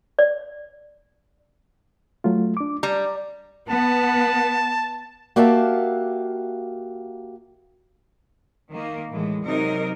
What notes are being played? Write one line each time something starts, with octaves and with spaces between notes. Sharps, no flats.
D5
F#3 A3 F4
D4 D6
G3 A#5
B3 A5
A#3 F#4 G4 E5 F5 A5
D#3 A#3
A2 E3 G#3
C3 F#3 D#4 A#4